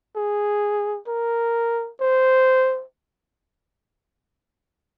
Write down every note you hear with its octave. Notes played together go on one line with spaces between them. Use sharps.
G#4
A#4
C5